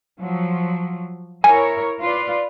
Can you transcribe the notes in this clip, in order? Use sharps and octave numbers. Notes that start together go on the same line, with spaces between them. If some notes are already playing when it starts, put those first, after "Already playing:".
F3 F#3
E4 A#4 C#5 G#5
F4 B4 D5